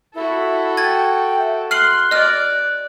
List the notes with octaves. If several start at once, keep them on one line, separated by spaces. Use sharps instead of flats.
E4 F#4 A4
G5 G#6 A6
E5
C6 F6 F#6 C7 F#7
D5 D#5 F6